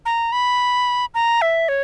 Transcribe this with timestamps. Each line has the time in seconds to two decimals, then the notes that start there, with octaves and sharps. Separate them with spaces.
0.06 A#5
0.32 B5
1.14 A#5
1.42 E5
1.69 C#5